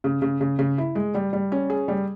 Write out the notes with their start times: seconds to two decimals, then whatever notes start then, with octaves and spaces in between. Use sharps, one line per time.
0.04 C#3
0.22 C#3
0.41 C#3
0.59 C#3
0.78 E4
0.95 G#3
1.15 G3
1.33 G3
1.52 C#4
1.70 G#4
1.88 G3